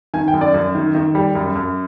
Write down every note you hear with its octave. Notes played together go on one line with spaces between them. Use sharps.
D#3 G#5
G5
F#2
D5
F#2
D#3
D#3
G3
F#2
F#2